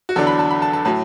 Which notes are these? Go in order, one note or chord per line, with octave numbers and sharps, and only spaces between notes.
F#4
E2 D3 F#3 D4 A4
B5
A5
B5
A5
A5
A2 F#3 A5